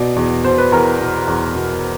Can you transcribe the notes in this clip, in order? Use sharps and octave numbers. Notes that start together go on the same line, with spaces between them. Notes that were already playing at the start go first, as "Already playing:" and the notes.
Already playing: B2 D5
E2
B2 C5
B4
E2 A#4
B2
E2
B2